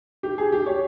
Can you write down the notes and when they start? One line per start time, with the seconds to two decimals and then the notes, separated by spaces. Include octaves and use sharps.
0.23 G4
0.38 G#4
0.52 G4
0.66 C#5